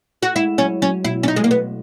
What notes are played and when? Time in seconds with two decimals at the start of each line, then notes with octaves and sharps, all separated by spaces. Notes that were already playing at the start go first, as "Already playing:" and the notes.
0.23 F#4
0.36 G#3 E4
0.58 F#3 C#4
0.82 F#3 C#4
1.05 B2 E4
1.23 C#4
1.28 D#4
1.36 G#3
1.44 A#3
1.51 B3